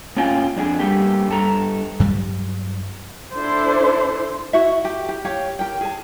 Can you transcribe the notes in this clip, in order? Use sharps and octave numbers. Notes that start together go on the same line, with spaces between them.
A2 A#3 C#4 F4 G5 G#5
F2 D4 G#4
G2 G3 A3 A#3 G4
G2 A4 A#5
G2 F#3 G3
D4 E4 A4 C5
E4 F#4 E5
G4
G4
G4 C#5 F5
G4 A#4 G5
G#4 A5